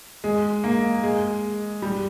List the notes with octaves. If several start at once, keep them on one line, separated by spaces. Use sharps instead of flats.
G#3
A#3
G#3
G3